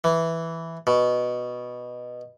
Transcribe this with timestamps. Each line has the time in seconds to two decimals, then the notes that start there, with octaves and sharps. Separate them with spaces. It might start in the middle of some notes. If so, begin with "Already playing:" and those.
0.04 E3
0.87 B2